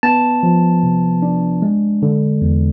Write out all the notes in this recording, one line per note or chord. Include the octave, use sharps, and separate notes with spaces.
B3 A5
F3
C3
D4
G#3
D3
E2